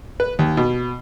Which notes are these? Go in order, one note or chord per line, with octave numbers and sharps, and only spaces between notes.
B4
D#2
B2